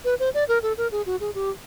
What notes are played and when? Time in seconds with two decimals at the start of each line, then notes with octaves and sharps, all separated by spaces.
0.05 B4
0.20 C5
0.34 D5
0.48 A#4
0.63 A4
0.78 A#4
0.92 G#4
1.06 F#4
1.20 G#4
1.35 G4